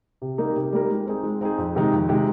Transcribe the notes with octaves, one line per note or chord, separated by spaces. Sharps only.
C3
G3 A#3 D#4 A#4
C3
G3 A#3 D#4 A#4
G#3
C4 D#4 G#4
G#3
C4 D#4 G#4
F2
C3 D#3 G#3 D#4
F2
C3 D#3 G#3 D#4